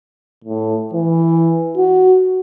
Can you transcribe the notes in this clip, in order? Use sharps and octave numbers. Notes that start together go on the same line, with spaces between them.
A2
E3
F#4